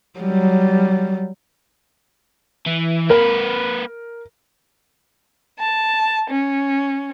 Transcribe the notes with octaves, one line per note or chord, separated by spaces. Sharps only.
F#3 G3
E3
A#3 A#4 B4
A5
C#4